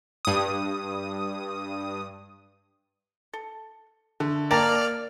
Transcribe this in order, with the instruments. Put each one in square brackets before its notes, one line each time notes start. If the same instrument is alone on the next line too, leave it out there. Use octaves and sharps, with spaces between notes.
[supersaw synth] G2 D#6
[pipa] A4
[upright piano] D3 [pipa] A3
[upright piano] A#3 A6 [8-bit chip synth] D5 F6 [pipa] G5 A5 A#5